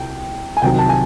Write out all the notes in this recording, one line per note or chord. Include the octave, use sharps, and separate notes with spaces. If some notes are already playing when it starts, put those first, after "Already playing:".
Already playing: C2 G5
G#5
C2 C3 D#3 F#3 G5
A5
G#5